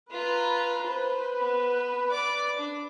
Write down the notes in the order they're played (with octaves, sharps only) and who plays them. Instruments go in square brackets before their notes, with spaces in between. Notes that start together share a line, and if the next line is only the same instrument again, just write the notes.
[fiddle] F4 A#5 [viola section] B4
[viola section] B4 [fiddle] C5
[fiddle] B3
D5 D6
D4